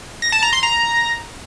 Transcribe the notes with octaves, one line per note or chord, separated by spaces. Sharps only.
A#6
A5
A#5
C6
A#5